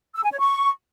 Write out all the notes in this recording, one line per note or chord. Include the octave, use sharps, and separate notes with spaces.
E6
G#5
C#5
C#6